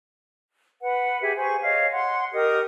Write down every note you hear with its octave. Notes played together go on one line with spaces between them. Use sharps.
B4 F#5
G4 G#4 E5
G#4 C5 G#5 C#6
C#5 D#5 F5
F#5 C6
G4 A#4 D#5 D#6